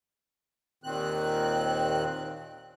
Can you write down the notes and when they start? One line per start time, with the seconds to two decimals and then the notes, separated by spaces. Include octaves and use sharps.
0.84 D#2 A#2 D#3 C4 F#6